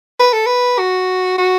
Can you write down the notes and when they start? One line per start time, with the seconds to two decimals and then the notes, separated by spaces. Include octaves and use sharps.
0.20 B4
0.33 A4
0.47 B4
0.79 F#4
1.38 F#4